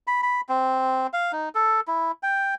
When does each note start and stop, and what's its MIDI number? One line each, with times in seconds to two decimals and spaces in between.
0.07 0.21 83
0.23 0.41 83
0.49 1.07 60
1.13 1.32 77
1.32 1.49 63
1.55 1.80 69
1.88 2.11 64
2.23 2.55 79